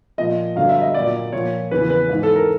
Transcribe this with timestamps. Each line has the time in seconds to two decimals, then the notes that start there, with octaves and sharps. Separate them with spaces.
0.18 A#2 F3 D#5
0.56 G2 D3 F#3 F5
0.69 E5
0.81 D#5
0.94 A#2 F#3 D5
1.33 A#2 F3 C#5
1.71 E2 C#3 E3 B4
1.90 B4
2.09 G#2 E3
2.23 A4
2.36 A#4